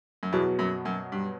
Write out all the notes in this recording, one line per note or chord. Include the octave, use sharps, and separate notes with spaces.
F#2
E2 B2 F#3 B3 F#4
F#2
F#2
G2